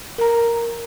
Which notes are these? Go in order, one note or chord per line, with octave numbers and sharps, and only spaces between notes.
A#4 A#5